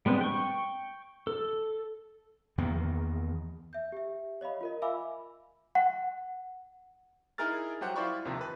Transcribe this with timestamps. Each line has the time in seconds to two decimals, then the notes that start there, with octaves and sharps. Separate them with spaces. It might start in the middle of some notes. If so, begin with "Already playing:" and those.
0.06 G3 G#3 B3 C4 D4
0.21 G5 C#6
1.27 A4
2.58 E2 D#3 A#3 B3
3.73 E5 G6
3.92 G4 E5
4.41 C#5 D#5 F5 B5
4.61 F4 A#4 D#5
4.82 E5 F5 G#5 B5 D6 E6
5.75 F#5
7.38 D#4 E4 G#4 A#4 F6 A6
7.81 F#3 G3 G4 C5 F#5
7.96 E4 F4 C5 D5 B5 C#6
8.25 D#2 C3 D#3 F3
8.41 B4